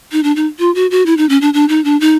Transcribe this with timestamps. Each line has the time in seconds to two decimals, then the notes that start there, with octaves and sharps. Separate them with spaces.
0.12 D#4
0.23 D4
0.36 D#4
0.59 F4
0.75 F#4
0.91 F#4
1.06 E4
1.17 D#4
1.29 C#4
1.41 D4
1.54 D4
1.69 D#4
1.84 D4
2.01 D#4